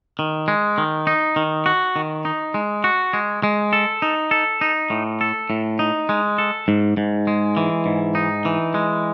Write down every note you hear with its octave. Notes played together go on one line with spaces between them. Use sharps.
D#3
G#3
D#3
D#4
D#3
F#4
D#3
D#4
G#3
F#4
G#3
G#3
A4
D#4
A4
D#4
A2
A4
A2
D#4
G#3
A4
G#2
G#2
G#3
E3
G#2
D#4
E3
G#3